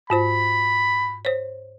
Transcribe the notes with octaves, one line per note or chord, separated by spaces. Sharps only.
G#2 F4 C5 B5
C5 C#5